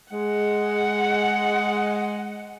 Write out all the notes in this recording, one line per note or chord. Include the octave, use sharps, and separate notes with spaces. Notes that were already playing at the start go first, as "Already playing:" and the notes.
G#3 F#5